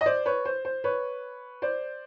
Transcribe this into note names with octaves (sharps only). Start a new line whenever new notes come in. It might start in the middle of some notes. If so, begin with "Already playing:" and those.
D#5
C5 D5
B4 C#5
C5
C5
B4 C#5
C5 D5